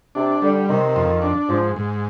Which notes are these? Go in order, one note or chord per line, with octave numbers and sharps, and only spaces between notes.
C3 D4
D3 G3
C3 D#3
F2
D4
G#2 F3
G#2